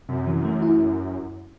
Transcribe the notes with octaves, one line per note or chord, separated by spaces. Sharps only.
F#2 C3
E3
A3
E4